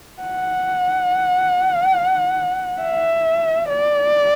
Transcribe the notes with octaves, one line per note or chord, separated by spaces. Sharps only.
F#5
E5
D5